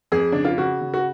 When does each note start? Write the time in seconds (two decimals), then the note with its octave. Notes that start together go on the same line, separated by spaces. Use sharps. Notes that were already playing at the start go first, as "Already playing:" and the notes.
0.12 F2 G#4
0.32 C#3 D4
0.44 F4
0.58 C#3 F#4
0.81 C#3
0.94 F#4